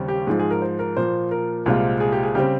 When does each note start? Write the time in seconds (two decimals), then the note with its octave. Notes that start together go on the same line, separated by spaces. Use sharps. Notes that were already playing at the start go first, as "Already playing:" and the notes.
Already playing: D#2 C#3 G3 C4
0.08 G4
0.27 G#2 F3 G#3 G#4
0.39 G#4
0.51 A#4
0.62 C5
0.79 A#4
0.97 A#2 F3 A#3 C5
1.31 A#4
1.66 C2 A#2 G#3 C4 F4
2.00 G#4
2.12 G4
2.23 G#4
2.35 C#3 G3 C4 G4